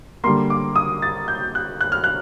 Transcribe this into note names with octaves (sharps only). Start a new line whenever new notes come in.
D3 G3 A#3 C6
D6
D#6
A6
G6
F#6
F#6
F6
F#6